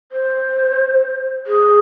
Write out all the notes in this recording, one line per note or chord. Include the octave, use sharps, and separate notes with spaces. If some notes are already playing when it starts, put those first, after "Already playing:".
C5
G#4